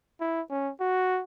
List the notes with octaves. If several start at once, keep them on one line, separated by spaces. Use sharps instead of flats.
E4
C#4
F#4